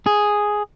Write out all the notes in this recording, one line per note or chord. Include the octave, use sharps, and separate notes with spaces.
G#4